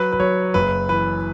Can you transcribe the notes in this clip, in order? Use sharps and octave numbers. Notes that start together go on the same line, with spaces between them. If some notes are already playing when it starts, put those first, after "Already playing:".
Already playing: F#3 B4
B4
F#3 C#5
F#1 B4
E3 B4